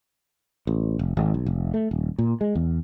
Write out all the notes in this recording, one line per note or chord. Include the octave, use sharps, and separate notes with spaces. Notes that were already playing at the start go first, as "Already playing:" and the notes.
A1
F1
G#1
B1
F1
A3
D#1
A#2
G#3
E2